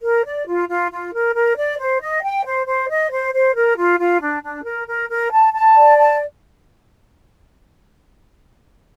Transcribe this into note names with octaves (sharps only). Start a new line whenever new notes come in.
A#4
D5
F4
F4
F4
A#4
A#4
D5
C5
D#5
G5
C5
C5
D#5
C5
C5
A#4
F4
F4
D4
D4
A#4
A#4
A#4
A5
A5
D5
A5